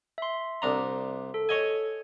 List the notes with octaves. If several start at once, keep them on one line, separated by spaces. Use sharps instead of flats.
E5 C6
C2 D4 A#5
A4
C#5 D#5 G#5